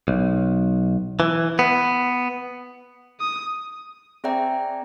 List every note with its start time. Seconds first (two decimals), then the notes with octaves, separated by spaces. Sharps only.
0.08 B1
1.20 E3
1.59 B3
3.20 D#6
4.24 C4 G#4 D5 E5 G5 A#5